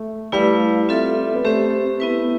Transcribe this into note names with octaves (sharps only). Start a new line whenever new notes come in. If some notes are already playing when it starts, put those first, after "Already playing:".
Already playing: A3
G3 A3 E4 B4 F5
C4 F4 A4 E5
B3
A3 C4 G4 C5 E5
B3 E4 B4